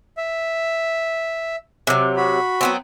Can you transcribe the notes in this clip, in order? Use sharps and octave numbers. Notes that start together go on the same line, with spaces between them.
E5
C3 F#3
F#4 B5
F#3 B3 C4